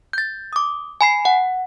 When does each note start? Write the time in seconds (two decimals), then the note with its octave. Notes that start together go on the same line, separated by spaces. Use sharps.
0.13 G6 A6
0.53 D6 D#6
1.01 G#5 B5 C7
1.25 F#5